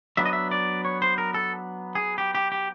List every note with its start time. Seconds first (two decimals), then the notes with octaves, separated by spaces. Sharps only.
0.17 F#3 B3 D4 E5
0.26 D#5
0.33 E5
0.51 D5
0.85 C#5
1.02 C5
1.18 A#4
1.34 A4
1.95 G#4
2.18 G4
2.35 G4
2.52 G4